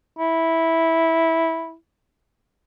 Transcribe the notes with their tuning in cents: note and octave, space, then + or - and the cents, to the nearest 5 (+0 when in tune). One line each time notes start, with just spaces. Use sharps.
E4 -10